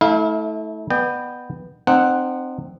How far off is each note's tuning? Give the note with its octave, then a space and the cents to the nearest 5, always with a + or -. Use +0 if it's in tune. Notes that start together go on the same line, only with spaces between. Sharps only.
A3 -15 E4 -35 F5 +0
B3 +0 D5 +45 G5 +5
C4 +0 D#4 -35 F#5 +0